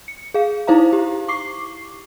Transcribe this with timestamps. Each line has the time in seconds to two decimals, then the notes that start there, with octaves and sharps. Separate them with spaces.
0.08 C#7
0.34 G#4 F5
0.67 D#4 E4 C5 F5 A#5
0.93 G4
1.28 C#6 D6 C7